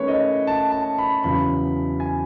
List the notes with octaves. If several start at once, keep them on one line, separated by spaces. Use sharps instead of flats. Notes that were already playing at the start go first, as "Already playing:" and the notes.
Already playing: D#3 A3 C#4 E4 B4 C#5
D#5
A5
A5
B5
E2 C#3 F#3 B5
G#5